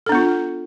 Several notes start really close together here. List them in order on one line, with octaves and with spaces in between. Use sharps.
A4 D4 B3 F4